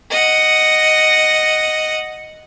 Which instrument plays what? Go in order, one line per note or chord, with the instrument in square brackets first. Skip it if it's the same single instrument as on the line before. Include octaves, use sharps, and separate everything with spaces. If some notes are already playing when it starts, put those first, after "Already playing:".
[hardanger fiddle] D#5 F#5